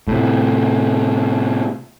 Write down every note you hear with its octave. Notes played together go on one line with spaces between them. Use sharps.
A2 C3